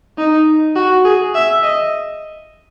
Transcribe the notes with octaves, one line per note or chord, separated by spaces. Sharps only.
D#4
F#4
G#4
E5
D#5